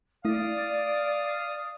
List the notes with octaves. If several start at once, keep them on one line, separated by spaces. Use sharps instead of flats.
A3 E4 D5 F5 D#6